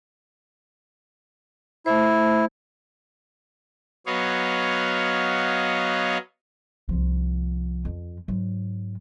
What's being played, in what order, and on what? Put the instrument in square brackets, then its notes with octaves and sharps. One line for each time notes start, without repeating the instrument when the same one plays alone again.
[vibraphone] A3 C5 [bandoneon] E4
[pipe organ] F#3 B3 C#5 D#5 F5
[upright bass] C2 F3
F2
G#2 F#3